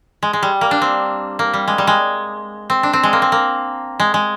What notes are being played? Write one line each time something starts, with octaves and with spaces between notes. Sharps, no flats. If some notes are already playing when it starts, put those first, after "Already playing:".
G#3
G#3
G3
A#3
D4
C4
A#3
G3
G#3
G3
G#3
C4
D4
C4
G#3
A#3
C4
A#3
G#3
G#3